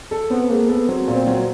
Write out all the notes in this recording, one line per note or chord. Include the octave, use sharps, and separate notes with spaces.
A4
B3 C4
G#3 A#3
B3 A4
F#3 C4
A#2
C4
F#3